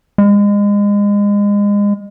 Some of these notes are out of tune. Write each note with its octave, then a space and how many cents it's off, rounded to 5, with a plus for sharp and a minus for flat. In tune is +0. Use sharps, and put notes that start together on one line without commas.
G#3 -30